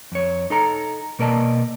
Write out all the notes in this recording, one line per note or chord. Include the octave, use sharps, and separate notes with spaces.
F2 C#5
D#4 A4 A#5
B2 A#3 A#4 D5 D#5 A5